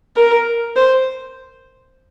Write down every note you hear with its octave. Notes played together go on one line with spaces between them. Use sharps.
A#4
C5